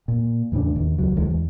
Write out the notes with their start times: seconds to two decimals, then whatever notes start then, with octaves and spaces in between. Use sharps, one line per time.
0.08 A#2
0.52 E2 A2 C#3 D4
0.76 D#2
0.98 C#2 F#3
1.17 D2 E3 G#3
1.31 E2